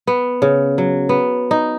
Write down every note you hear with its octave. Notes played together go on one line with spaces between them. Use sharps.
B3
C#3
F#3
B3
D#4